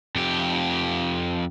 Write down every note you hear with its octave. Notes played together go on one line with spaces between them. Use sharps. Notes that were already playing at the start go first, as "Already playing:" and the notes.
F2 G4